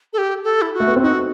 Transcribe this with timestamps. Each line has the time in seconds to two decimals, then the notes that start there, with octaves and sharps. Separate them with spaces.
0.13 A4
0.18 G4
0.44 A4
0.62 E4
0.74 F#4
0.80 A3
0.87 B3
0.96 C4
1.03 D#4 F#4